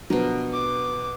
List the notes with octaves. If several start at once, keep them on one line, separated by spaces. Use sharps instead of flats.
B2 D3 F3 F#3 A#4
D6